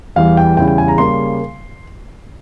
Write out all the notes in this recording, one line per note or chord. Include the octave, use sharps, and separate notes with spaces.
E2 E3 G3 F5
G5
E2 C#3 G3 C#4 E4 G5
G5
G#5
A#5
C#3 G3 A#3 C6